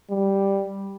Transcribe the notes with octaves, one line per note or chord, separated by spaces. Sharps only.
G3